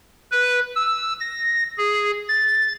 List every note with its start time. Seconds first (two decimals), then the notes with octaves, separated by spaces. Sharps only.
0.31 B4
0.76 E6
1.20 A#6
1.78 G#4
2.28 A6